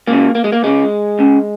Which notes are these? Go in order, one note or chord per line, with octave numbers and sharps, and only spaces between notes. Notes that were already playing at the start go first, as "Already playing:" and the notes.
C#2 C#3 A#3
A#3
G#3
A#3
C#2 C#3 G#3
C#2 C#3